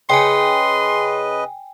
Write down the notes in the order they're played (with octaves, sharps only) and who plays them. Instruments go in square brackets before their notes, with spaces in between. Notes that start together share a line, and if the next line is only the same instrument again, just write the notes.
[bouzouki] C#3 [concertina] B4 D#5 [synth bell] G5 G#5 [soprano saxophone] C6